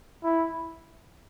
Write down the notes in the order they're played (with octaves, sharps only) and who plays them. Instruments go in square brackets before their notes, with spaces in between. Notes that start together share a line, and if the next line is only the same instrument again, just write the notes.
[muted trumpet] E4